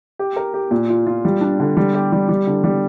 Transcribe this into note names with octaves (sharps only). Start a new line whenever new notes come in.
G4
A#4
G4
A#2
F4
F4
G3
D4
D3
G3
G4
G3
G3
D3
G3